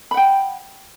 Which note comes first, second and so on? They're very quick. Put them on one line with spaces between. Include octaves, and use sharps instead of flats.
B5 F#5 G5